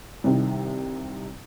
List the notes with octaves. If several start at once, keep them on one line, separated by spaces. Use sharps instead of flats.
C2 C3 D#3